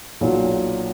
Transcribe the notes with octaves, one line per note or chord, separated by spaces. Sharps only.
B1 A#2 F#3